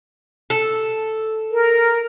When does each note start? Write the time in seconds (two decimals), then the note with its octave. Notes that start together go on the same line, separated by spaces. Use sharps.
0.50 A4
1.51 A#4